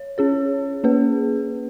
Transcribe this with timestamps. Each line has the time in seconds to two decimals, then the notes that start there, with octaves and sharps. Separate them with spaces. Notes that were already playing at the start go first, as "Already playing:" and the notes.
Already playing: C#5
0.18 C#4 G#4 C#5
0.84 A#3 C#4 G#4 B4